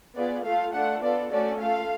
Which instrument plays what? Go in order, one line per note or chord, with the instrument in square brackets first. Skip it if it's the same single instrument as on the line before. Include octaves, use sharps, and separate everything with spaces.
[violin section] B3 F4 G#4 D5
A3 F4 A4 F5
A3 D4 F4 A4 F#5
B3 F4 A4 D5
A3 C#4 F#4 A4 D5
A3 F4 A4 F5